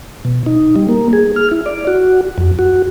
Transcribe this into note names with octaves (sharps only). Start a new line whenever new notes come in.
B2
D#4
G3
A#3
G#4
F6
E4
D5
F#4
F2
F#4